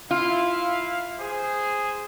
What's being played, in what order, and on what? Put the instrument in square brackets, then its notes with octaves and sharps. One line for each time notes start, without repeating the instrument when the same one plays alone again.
[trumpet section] E4 F5 [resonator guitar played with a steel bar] F4
[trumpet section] G#4 C5